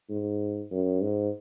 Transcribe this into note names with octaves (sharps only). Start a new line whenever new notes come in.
G#2
F#2
G#2